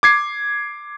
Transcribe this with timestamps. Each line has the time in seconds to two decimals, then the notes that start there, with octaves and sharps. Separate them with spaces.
0.03 D6 G#6 C7